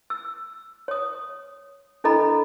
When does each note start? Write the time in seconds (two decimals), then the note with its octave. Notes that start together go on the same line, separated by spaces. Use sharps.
0.10 E6
0.88 C#5 D#6
2.04 D4 E4 A4 D#5 A#5 B5